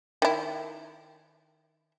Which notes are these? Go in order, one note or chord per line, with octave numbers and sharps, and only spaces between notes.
D#3 E4